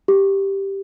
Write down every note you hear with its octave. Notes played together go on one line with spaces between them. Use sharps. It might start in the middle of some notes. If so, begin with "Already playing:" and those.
G4